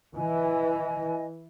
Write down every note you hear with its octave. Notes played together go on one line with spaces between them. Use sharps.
E3 D#5 G#5